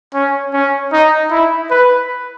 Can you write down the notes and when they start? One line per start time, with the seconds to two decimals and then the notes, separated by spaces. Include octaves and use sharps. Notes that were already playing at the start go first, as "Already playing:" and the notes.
0.14 C#4
0.54 C#4
0.93 D#4
1.31 E4
1.71 B4